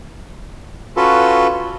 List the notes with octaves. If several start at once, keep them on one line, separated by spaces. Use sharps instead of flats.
C#4 F4 F#4 A4 B4